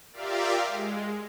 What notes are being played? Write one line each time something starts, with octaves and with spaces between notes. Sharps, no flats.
F4 G4 A#4 D5 E5 F5
G#3